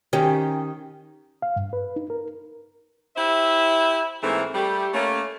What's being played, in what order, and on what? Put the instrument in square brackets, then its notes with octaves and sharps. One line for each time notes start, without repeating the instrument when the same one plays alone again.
[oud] D#3 C#4 G4
[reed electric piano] F5
G2
B4
D#4
A#4
[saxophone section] E4 G4 C5 E5
G#2 E3 A3 A#3 C4 E5
G3 A3 G4
A3 A#3 C#4